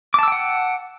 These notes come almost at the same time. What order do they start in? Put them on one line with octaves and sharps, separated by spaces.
D6 A5 E6 G5 F#5